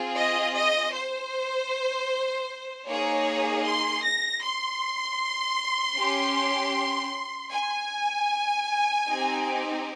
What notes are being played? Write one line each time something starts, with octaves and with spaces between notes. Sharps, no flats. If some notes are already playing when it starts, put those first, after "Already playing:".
Already playing: C4 F4 G#4
D#5
D#5
C5
A#3 D#4 G#4 C#5
C6
A#6
C6
C#4 G4
G#5
C4 D#4 G4